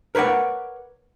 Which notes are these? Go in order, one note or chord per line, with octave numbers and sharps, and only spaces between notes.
A#4 B4 C#5 D5 F#5